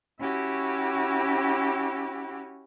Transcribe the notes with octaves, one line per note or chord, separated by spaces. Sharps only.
C#4 E4 F#4 G4